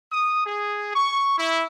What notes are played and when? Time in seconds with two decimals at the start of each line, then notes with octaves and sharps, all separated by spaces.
0.11 D#6
0.44 G#4
0.93 C#6
1.37 E4